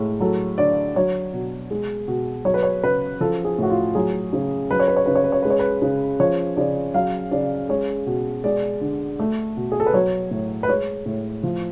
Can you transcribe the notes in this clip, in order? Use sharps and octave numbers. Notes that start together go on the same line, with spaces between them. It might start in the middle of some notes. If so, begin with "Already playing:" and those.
Already playing: A2 G#3
F#3 A4
D3 D5
F#3 C#5
B2
G#3
B2
F#3 C#5
B4
C#5
C#3 B4
F3 A4
G#4
A2 F#4
F4
F#3 G#4
C#3
F#3 B4
C#5
B4
C#5
C#3 B4
C#5
B4
C#5
G#3 B4
C#5
B4
C#3
F3 C#5
C#3 D5
F#3 F5
C#3 D5
G#3 C#5
B2
G#3 D5
D3
A3
B2
G#4
A4
B4
F#3 C#5
A2
B4
G#3 C#5
A2
F3